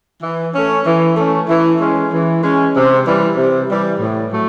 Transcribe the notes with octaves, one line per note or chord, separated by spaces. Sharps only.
E3
A3 C#4
E3
A3 C#4
E3
G#3 C#4
E3
G#3 C#4
C3
E3 G3
C3
E3 G3
A2
F#3 A3